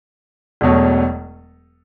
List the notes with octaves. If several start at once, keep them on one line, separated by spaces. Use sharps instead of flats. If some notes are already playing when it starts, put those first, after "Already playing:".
E1 E2 B2 F#3 A3